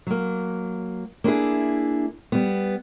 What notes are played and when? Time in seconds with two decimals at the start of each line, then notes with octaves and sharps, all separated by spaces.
0.07 F#3 A#3
1.24 A#3 D4 E4 G#4
2.32 G3 B3